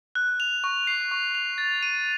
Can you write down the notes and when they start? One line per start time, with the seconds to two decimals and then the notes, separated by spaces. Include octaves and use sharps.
0.15 F#6
0.40 F7
0.64 C#6
0.87 C7
1.11 C#6
1.35 F7
1.58 A6
1.83 D#7